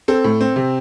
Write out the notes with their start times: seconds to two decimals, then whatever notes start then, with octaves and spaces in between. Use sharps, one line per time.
0.08 C4 A4
0.24 A2
0.41 C4
0.56 C3